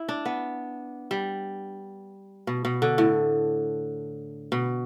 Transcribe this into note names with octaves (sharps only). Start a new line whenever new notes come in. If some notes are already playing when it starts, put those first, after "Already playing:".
Already playing: E4
D4
B3
G3
B2
B2
D3
A2
B2